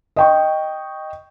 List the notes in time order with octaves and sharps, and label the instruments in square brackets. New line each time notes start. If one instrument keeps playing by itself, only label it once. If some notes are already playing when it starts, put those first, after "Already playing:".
[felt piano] D#5 G5 C#6